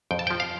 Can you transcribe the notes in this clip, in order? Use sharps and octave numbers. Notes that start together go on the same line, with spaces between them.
F2 G5
A5
F3 G5
F5